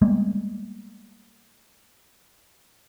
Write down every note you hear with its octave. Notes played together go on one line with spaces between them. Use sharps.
G3 G#3 A#3 B3